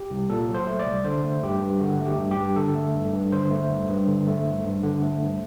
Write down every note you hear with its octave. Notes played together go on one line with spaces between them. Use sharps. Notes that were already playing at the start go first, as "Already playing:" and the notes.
Already playing: G4
C2
A#2 A4
F#3
C5
A3
D5
C2
D3 C5
A3
G2 G4
G2
D3 F#4
A3
G4
G2
G4
G2
D3 A4
A3
G2
G2
D3 C5
A3
G2
G2
D3
A3
G2
G2
D3
A3
G2